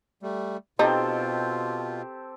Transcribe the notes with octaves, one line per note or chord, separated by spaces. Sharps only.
G3 A3
B2 C4 D#4 F4 G4 A4